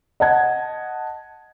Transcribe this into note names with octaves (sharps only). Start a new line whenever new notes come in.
D#5 F#5 A5 G#6